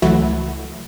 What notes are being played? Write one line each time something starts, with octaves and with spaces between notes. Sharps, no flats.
C#2 E3 F#3 A3 E4 F#4